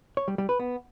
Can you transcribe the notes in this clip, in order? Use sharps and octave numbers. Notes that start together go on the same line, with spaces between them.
C#5
G3
G3
B4
B3